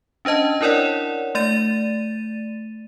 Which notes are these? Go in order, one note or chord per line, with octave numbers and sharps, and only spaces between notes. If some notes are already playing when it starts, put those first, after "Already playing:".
C#4 D4 C5 D#5 A5
D4 E4 A#4 C#5 D5 F#5
A3 D5 A6 D#7